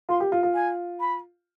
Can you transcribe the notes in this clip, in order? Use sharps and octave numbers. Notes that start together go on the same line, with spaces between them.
F4 C6
G4
F4
F4
G#5
B5